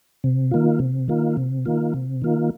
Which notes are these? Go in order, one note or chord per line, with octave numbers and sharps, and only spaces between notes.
C3
D#3 A#3 F4
C3
D#3 A#3 F4
C3
D#3 A#3 F4
C3
D#3 A#3 F4